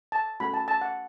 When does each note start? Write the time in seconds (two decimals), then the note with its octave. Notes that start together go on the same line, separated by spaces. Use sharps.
0.12 A5
0.40 A3 C#4 F#4 B5
0.54 A5
0.68 A5
0.81 F#5